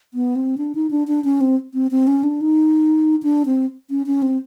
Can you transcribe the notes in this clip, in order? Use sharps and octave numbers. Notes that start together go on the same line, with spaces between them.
B3
C4
D4
D#4
D4
D4
C#4
C4
C4
C4
C#4
D4
D#4
D4
C4
C#4
C#4
C4